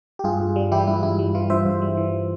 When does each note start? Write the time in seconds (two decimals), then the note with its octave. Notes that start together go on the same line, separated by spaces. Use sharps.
0.19 G4
0.24 G2 F4 G#4
0.40 G2
0.56 G3
0.71 E3 E4 G4
0.87 G2 E4
1.03 G2 E4
1.19 G3
1.35 E3 F4
1.50 G2 C5 E5
1.66 G2
1.82 G3
1.97 E3